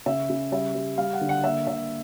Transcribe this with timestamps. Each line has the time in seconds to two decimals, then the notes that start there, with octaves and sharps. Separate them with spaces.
0.06 C#3 E5
0.30 C#3
0.52 G3 E5
0.75 G3
0.97 G3 F5
1.13 F#5
1.21 D3
1.29 F#5
1.44 A#3 E5
1.67 D3 E5